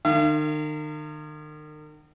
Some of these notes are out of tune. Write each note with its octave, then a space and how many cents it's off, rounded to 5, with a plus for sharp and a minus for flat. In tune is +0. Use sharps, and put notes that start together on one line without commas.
D#3 -40 F5 -40